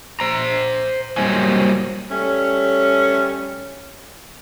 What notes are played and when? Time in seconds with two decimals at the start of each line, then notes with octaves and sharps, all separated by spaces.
0.20 C5 A#5
1.17 F#3 G3 A#3 C5 D#5 G#5
2.10 G3 A3 C#4